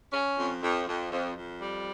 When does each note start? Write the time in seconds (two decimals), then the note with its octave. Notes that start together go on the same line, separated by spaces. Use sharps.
0.12 C#4
0.37 F2
0.62 F2
0.87 F2
1.11 F2
1.36 F2
1.61 G3